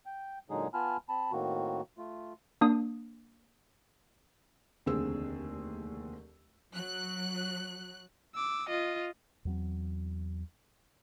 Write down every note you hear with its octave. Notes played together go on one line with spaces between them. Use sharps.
G5
A#2 D3 F#3 G#3 D#4 G#4
B3 F4 G#5 A5 B5 F6
C4 A5 B5
A2 D#3 A#3 C4 F#4
A3 F4
A#3 D4 D#6
F1 D#2 D3 C4 G#4 E6
F#3 F#6
D6 E6
F4 D#5
E2 F#3 C4